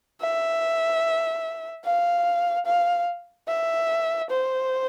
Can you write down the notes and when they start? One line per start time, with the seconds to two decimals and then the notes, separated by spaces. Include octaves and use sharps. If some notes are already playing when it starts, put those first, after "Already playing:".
0.21 E5
1.84 F5
2.66 F5
3.48 E5
4.30 C5